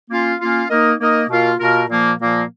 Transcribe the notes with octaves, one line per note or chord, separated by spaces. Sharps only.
A#3 C#4 F4
A#3 C#4 F4
A#3 D#4 A#4 D#5
A#3 D#4 A#4 D#5
B2 A#3 F4 A#4
B2 A#3 F4 A#4
A#2 F3 A#3
A#2 F3 A#3